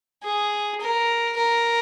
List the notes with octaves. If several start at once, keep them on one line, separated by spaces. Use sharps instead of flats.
G#4
A#4
A#4